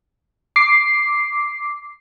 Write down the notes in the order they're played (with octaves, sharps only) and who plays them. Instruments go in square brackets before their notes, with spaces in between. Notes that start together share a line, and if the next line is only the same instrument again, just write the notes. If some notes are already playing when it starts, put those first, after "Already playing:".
[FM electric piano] D6 C7